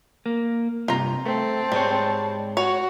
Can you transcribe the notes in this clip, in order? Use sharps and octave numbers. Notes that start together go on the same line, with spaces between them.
A#3
G2 C3 F4 A#5
A3 C4 A5
G#2 G3 G#3 C#5
F#4 C#5